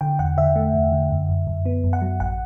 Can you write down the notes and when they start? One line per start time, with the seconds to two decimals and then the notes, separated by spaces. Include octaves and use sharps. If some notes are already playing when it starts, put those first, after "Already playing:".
0.01 D3 G5
0.19 E2 F#5
0.37 D3 E5
0.56 A3
0.74 E2
0.92 D3
1.10 F#2
1.29 F#2
1.47 F#2
1.65 B3
1.84 F#2
1.93 F#5
2.02 F#3
2.20 A1 F#5